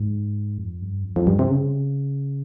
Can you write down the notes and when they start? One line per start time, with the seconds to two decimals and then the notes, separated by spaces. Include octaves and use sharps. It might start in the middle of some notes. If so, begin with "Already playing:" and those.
Already playing: G#2
0.58 F2
0.82 G2
1.04 F2
1.16 F2
1.27 G2
1.39 C3
1.50 C#3